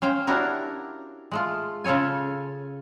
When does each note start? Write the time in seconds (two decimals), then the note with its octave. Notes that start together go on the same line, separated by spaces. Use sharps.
0.02 C#4 C5 F5 G5
0.27 D4 E4 F#4 G4 A#4
1.31 G#3 A3 F4
1.84 C#3 F4 A4 C#5 G#5